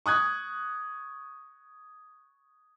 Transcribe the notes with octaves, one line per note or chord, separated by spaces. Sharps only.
C#6 D#6 F#6 G#6